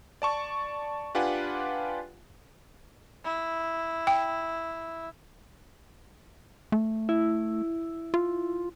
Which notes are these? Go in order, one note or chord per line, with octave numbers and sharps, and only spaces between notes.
D5 A5 C#6
D4 F4 G4 B4 F#5 G#5
E4
G5
A3
E4
F4